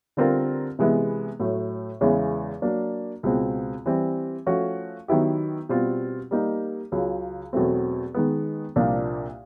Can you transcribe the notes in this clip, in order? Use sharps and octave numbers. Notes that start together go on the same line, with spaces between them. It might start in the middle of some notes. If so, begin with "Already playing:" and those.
D3 G3 C4 F4 A#4
C3 E3 G#3 B3 E4
A2 F#3 A3
E2 C#3 E3 G#3 C#4
F#3 A#3 D4
C#2 B2 G#3 C4
E3 G3 C4
F3 A3 C#4 F#4
D#3 F#3 B3 E4 G4
B2 G3 C4 F4
G3 A#3 D#4
C#2 C#3 F#3
E2 B2 F#3 A3 C4
D#3 G#3 B3
C2 A#2 F3 A#3 D4